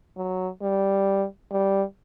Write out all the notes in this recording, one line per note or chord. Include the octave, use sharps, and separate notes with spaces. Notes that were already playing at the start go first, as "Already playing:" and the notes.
F#3
G3
G3